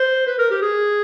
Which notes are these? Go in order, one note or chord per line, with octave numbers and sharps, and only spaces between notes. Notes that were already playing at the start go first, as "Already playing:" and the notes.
Already playing: C5
B4
A#4
G4
G#4